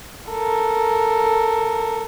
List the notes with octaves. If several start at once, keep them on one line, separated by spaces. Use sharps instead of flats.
A4 A#4